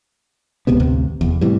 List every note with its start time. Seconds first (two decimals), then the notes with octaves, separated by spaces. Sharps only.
0.67 D1 C#2 C3 B3
0.79 A1 D2 C3
1.21 F1 E2
1.41 A2 C3 E3 G3